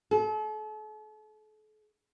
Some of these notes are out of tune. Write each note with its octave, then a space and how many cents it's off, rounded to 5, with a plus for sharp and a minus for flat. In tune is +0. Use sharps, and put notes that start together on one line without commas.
A4 -40